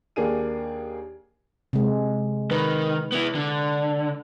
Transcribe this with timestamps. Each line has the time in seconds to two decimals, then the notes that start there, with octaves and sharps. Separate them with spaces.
0.16 D#2 A#3 D4 G#4 D#7
1.73 C3 G#3
2.51 D#3 B4
3.12 B3 E4
3.35 D3